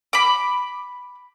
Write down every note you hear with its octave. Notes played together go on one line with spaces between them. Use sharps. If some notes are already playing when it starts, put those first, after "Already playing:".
B5 D6